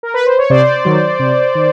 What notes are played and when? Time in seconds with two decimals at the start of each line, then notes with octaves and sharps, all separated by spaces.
0.03 A#4
0.14 B4
0.26 C5
0.39 C#5
0.50 C3 C5 D5
0.85 D#3 F#3
1.19 C3
1.55 D#3